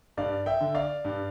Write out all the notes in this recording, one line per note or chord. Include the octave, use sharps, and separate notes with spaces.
G2 D5 F5
E5 G5
D3
D5 F5
G2